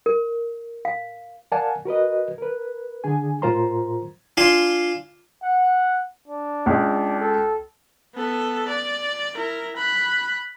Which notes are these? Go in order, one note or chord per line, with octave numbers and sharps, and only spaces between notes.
A#4
F5
A#4 D5 F5 F#5 G#5 A5
F#4 A#4 B4 D#5
A#4 B4
D3 D4 G#4 G#5
A2 F4 A#4 C5 A#5 C6
D4 F4 G#5 C6
F#5
D4
C#2 G#4
A4
B3 A4
D5
E4 A#4
B5 F#6